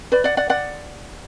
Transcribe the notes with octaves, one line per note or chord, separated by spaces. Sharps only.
B4 D5
D5 F#5
D5 F#5
D5 F#5